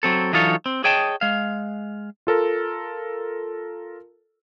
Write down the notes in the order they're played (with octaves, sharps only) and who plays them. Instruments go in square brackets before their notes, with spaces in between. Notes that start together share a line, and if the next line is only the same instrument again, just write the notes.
[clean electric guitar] F#3 C4 A4
E3 F#3 D#4 F4 A4 C#5
C4
G#4 C#5 D#5 G5 A5
G#3 F5
[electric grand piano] F4 A4 A#4